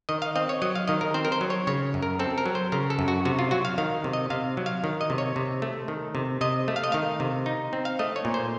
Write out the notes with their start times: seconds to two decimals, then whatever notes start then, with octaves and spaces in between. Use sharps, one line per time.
0.09 D#3 D#5
0.22 F5
0.36 C4 D#5
0.49 C#5
0.62 F#3 D#5
0.75 F5
0.88 D#3 D#5
1.01 A#4
1.14 C4 C5
1.25 A#4
1.32 C5
1.41 F#3
1.50 C#5
1.67 C#3 C#5
1.94 F#2
2.03 A#4
2.19 C4 A4
2.38 A#4
2.46 F#3
2.55 C5
2.72 C#3 A#4
2.90 A4
2.99 F#2
3.08 F#4
3.25 C3 F#4
3.39 F4
3.51 F#3 F#4
3.65 F5
3.78 D#3 F5
4.04 C3
4.13 D#5
4.30 C3 F5
4.57 F#3
4.66 F5
4.84 D#3
5.01 D#5
5.10 C3
5.18 C#5
5.36 C3
5.62 A3
5.88 D#3
6.15 C3
6.41 C3 D#5
6.68 A3
6.76 F5
6.84 D#5
6.92 D#3 F5
7.20 C3
7.46 D#4
7.73 C4
7.85 F5
7.99 A3 D#5
8.16 C#5
8.25 A#2
8.34 C5